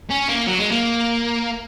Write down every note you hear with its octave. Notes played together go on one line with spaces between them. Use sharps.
C#4
A#3
F#3
G#3
A#3